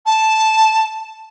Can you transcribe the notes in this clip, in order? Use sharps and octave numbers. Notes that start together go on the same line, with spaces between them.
A5